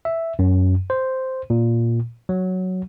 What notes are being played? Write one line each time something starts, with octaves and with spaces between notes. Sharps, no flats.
E5
F#2
C5
A#2
F#3